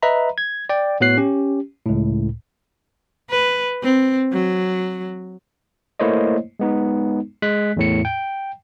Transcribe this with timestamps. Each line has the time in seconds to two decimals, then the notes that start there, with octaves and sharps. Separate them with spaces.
0.03 B4 D#5 E5 A#5 B5
0.38 G#6
0.69 D5 G5
1.00 A2 B3 F#4 C#5 F#6 C7
1.17 C#4 G4
1.86 C#2 A2
3.31 B4
3.83 C4
4.32 F#3
6.00 A3 A#3 E4 C5 C#5 D#5
6.59 G#3 B3 D#4
7.42 G#3 F#6 B6
7.77 E2 A2 C#7
8.05 G5